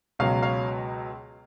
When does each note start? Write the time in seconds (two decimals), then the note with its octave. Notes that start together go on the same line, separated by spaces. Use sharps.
0.19 C#2 B2 F#3 C#5 F5
0.42 C#5 F5